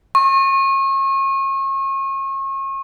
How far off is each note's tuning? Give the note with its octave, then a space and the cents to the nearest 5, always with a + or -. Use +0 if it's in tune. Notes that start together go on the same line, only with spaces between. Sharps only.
C#6 -35